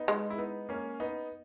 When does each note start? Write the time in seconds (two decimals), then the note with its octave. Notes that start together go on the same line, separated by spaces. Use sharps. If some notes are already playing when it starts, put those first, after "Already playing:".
Already playing: B3 D#4
0.08 G#3
0.30 E4
0.38 B3 D#4
0.69 A#3 C#4
1.00 B3 D#4